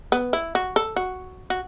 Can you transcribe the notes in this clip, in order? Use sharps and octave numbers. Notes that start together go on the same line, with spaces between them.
B3
E4
F#4
A4
F#4
F#4